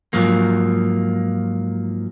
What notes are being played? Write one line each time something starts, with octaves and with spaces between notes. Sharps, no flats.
G#2 F3 F#3 A#3